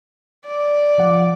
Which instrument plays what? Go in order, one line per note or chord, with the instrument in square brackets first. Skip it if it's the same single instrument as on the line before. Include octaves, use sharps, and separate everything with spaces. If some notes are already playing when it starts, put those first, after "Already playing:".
[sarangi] D5
[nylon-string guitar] F3 F#5